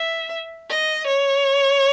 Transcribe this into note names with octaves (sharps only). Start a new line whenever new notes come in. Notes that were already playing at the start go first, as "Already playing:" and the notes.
Already playing: E5
D#5
C#5